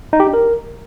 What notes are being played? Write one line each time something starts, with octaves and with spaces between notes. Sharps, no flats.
D#4
G4
D4
A#4